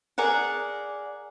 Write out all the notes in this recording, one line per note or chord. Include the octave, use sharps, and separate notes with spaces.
G#4 A#4 D5 F#5